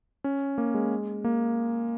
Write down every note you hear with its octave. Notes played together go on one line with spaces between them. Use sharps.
C#4
A#3
G#3
A#3